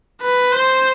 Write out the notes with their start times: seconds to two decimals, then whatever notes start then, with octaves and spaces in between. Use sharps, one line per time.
0.22 B4
0.52 C5